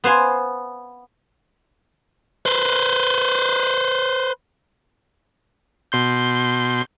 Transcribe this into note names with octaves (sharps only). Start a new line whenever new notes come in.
B3 C5 F5 G#5
B4 C5
B2 C6 G6